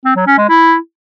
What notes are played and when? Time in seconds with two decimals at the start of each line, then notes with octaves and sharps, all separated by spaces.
0.05 C4
0.16 F#3
0.27 C#4
0.38 G#3
0.49 E4